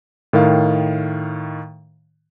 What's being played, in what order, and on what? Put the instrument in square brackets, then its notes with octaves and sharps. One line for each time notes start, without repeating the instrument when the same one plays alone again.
[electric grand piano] A2 D#3 A#4 F5